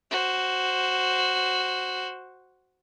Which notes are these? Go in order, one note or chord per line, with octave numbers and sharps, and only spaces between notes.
F#4 C5